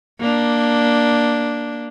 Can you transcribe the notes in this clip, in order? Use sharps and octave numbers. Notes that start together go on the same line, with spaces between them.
A#3 D4